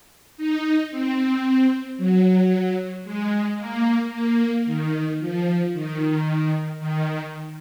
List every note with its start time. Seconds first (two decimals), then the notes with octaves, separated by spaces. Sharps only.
0.37 D#4
0.90 C4
1.98 F#3
3.04 G#3
3.59 A#3
4.12 A#3
4.66 D#3
5.20 F3
5.74 D#3
6.80 D#3